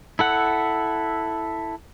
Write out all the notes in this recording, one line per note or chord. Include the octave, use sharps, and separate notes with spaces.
E4 A4 F#5